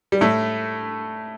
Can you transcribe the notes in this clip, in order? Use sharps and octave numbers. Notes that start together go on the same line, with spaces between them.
G3
A2 A3